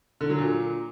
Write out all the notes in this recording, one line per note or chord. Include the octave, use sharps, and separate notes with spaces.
D3
F#3
A#2